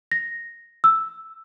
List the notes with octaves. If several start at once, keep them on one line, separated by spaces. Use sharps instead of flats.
A#6
E6